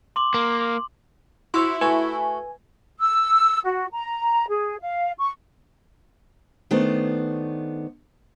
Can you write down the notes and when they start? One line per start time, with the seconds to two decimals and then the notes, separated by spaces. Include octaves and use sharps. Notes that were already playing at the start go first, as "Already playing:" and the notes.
0.16 C6 D6 F#7
0.34 A#3
1.54 E4 F#4 C5 C6 C#6 E6
1.81 A3 F#4 B4 G#5
2.99 E6
3.65 F#4
3.93 A#5
4.49 G#4
4.81 F5
5.19 C#6
6.71 D#3 A3 B3 D4 C5